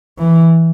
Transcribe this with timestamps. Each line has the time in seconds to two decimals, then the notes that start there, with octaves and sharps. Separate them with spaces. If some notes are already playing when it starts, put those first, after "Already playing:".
0.18 E3